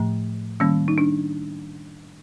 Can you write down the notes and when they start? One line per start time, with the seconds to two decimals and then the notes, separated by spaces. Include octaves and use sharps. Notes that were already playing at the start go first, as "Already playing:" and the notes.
Already playing: A2 F3 A3
0.60 D#3 G3 A#3 C#4
0.88 D#4
0.98 D4